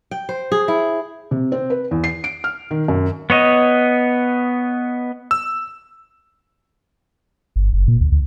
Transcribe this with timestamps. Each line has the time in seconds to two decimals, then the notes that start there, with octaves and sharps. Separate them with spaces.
0.11 G5
0.29 C5
0.52 G#4
0.68 E4
1.31 C3
1.52 C4
1.70 B4
1.91 E2
2.04 C7
2.24 D7
2.44 F6
2.71 D#3
2.88 F#2
3.30 B3 C#5 D#5
5.31 E6
7.56 G1
7.73 F#1
7.88 A#2
8.01 D2
8.12 D2